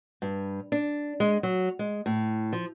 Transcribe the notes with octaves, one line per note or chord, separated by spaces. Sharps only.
G2
D4
G#3
F#3
G#3
A2
F3